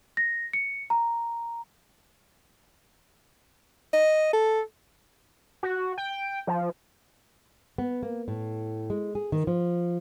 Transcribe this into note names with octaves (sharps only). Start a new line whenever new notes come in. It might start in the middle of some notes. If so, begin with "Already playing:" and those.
A#6
C#7
A#5
D#5
A4
F#4
G5
F3
B3
A#3
A2
G#3
G#4
D#3
F3